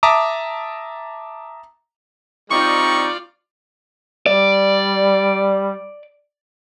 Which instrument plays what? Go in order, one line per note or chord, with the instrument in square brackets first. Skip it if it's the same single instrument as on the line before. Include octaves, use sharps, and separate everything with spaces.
[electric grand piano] E5 A5 A#5 D6 D#6
[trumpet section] G3 C4 D#4 [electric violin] F4 D5 [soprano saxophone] C#6
[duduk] G3 [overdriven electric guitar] D5